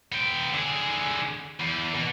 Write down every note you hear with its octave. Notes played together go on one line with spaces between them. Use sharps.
B3 G5
D3 G#4
E2
B2